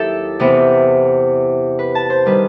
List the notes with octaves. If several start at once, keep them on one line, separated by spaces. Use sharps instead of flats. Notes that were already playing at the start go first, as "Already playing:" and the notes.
Already playing: D#2 D#3 F#3 E4 G4 A4
E2 C3 E3 B3
B4
A5
C5
D#3 G3 B4